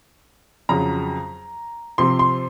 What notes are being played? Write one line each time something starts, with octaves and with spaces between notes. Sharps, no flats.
F2 C#3 F#3 A#5
C3 F3 C4 C6
C6